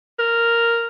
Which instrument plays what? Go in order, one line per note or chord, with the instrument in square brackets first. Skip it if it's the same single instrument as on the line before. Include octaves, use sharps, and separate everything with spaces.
[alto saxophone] A#4